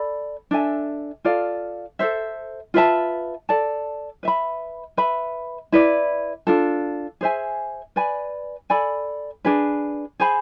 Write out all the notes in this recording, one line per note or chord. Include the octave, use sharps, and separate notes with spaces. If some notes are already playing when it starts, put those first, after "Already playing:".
Already playing: A4 D5 B5
D4 A4 E5 G#5
F4 A4 D5 F5
A4 C5 E5
F4 B4 E5 A5
A4 D5 A5
B4 E5 B5
B4 E5 B5
E4 B4 D5
D4 F4 A4
G#4 C5 E5 G#5
B4 D5 G#5 B5
A4 D5 G#5 B5
D4 G#4 B4
G#4 C5 G#5 B5